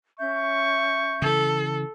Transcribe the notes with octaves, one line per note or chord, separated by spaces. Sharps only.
C#4 E5 C#6 G6
C#3 E3 A4